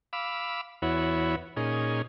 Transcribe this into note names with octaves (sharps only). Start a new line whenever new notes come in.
F5 B5 D6 E6
E2 B3 E4 F#4 C#5
A#2 C#4 D#4 G#4